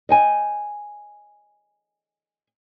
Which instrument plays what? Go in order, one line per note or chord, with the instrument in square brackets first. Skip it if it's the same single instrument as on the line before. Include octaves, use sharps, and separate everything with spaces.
[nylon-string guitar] D#5 G5 G#5